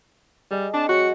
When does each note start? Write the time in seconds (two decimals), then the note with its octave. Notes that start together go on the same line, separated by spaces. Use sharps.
0.51 G3 G#4 D#5
0.73 C4 D4 A5
0.89 F#3 G#3 F#4 C#5 C#7